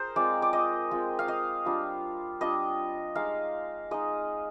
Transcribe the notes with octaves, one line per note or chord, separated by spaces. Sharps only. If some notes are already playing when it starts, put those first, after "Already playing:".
Already playing: G#4 A#4 C5
G#3 C4 F4 D5
D5
D#5
G#3 C4 F4
F5
D#5
G3 D4 F4
G3 D4 F4 D#5
G#3 D#4 F5
G#3 D#4 D#5